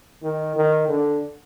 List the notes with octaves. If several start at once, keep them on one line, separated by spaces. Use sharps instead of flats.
D#3
D#3
D3